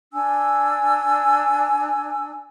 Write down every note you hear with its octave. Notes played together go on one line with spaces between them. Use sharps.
D4 G#5 E6